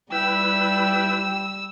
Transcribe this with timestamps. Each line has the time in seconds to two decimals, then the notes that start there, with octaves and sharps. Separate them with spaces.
0.12 G3 E4 B4 G5 E6